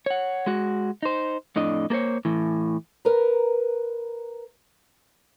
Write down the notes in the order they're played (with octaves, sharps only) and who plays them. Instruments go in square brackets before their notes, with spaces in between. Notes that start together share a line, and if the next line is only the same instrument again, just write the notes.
[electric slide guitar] C#5 F#5
G#3 F#4
D#4 C5
F2 A2 D4 D#5
A#3 A4 A#4 C5 C#5
A2 E3
[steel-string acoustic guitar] A#4 B4 A#5